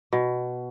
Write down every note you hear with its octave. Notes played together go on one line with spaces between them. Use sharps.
B2